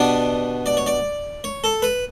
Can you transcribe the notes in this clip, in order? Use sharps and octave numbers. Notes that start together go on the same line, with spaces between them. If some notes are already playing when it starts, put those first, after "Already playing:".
Already playing: B2 G3 B3 D4
D5
C#5
D5
C#5
A4
B4